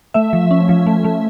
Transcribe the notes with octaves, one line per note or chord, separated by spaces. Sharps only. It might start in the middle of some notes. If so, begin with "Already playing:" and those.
A3 E5
F3
C#4
F3
A3
A3